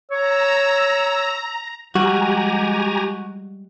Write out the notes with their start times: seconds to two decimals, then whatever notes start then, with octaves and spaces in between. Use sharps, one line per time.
0.11 C#5 A#5 E6
1.95 F3 G3 G#3 F#4 G4 G#5 A#5